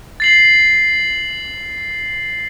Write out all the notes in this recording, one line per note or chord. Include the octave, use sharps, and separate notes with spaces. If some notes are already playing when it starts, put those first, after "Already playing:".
A6 C7 F#7